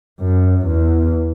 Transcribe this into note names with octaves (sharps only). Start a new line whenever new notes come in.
F#2
E2